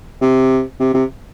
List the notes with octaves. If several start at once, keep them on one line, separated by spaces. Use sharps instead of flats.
C3
C3
C3